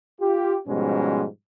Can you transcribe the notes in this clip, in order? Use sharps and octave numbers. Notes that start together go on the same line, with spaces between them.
F4 G4
G#2 B2 F3 G3 G#3 C#4